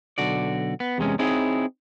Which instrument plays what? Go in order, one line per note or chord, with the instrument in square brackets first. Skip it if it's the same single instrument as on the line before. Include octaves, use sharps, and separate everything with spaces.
[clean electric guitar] B1 D3 F#4 D5
B3
E2 C3 G#3 C#4
C4 D#4 E4 G#4 C#5